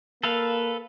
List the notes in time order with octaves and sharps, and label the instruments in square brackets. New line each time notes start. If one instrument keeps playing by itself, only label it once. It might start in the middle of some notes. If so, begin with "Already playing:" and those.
[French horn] A#3 [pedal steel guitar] A4 B4 F5